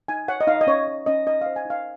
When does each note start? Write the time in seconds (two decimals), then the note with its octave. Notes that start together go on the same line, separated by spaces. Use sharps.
0.08 D#4 G#5
0.28 C#5 F#5
0.41 D#5
0.47 D#4 F5
0.61 D#5
0.67 C#4 C#5
0.87 C#5
1.06 C#4 D#5
1.26 D#4 D#5
1.41 C5 F5
1.56 G#5
1.65 D#4 F5